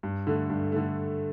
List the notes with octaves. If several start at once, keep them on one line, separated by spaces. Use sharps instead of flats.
G2
D3 A3
G2
D3 A3